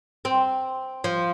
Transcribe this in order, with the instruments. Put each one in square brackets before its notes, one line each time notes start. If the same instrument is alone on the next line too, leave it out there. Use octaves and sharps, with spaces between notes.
[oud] C4
F3